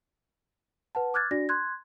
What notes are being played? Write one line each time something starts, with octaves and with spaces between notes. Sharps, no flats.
B4 F#5 A5
D6 F6 F#6 G#6 A6
D4 F#4 D5 A#6
C6 F#6 G#6